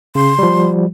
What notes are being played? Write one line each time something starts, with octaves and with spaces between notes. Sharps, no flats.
C#3 C6
F3 G3